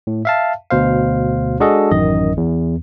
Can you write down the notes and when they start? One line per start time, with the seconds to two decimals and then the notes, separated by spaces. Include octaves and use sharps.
0.07 A2
0.25 E5 F5 A5
0.70 D2 B2 C5 F5
1.60 G#3 D4 F#4 G#4 A4 D#5
1.91 A1 F#2 D#3 D#5
2.37 E2